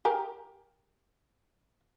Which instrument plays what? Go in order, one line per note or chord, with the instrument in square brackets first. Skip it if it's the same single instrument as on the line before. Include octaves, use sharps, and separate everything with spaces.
[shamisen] G4 G#4 A#4